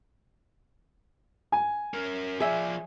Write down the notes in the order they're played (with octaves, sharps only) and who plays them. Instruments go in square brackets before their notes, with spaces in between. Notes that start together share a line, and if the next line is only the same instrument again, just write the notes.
[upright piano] G#5
[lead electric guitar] C#4 A#4
[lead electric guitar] F3 D5 [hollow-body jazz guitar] G#4 E5